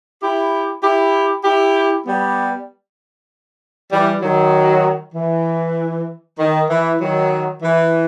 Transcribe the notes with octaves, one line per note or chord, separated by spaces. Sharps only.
E4 G4
E4 G4
E4 G4
G3 B3
E3 G3
D#3 F#3
E3
D#3
E3
D#3 F#3
E3